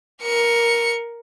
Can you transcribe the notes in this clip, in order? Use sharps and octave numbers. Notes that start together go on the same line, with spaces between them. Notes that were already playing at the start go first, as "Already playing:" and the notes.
A#4 C#7